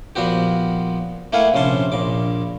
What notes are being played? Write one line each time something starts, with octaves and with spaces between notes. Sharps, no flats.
A#2 F3 B3 F#4 G4
A3 A#3 E4 F5 F#5 G#5
A#1 C3 C#4 A5 C6
A#1 A#2 D6